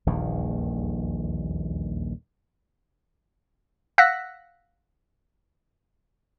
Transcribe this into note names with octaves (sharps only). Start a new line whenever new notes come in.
D#1 A#1 E2 D#3
F5 F#5 E6 F#6 A#6 B6